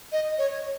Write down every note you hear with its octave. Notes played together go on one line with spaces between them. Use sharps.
D#5
C#5